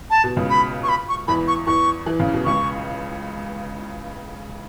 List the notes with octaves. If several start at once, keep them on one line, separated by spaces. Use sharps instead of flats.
A5
B2
C#2 C#3
B5
C#6
B5
C#6
E2 E3 B5
C#6
E2 E3 C#6
E3
C#3
B2
C#2 C#3 C#6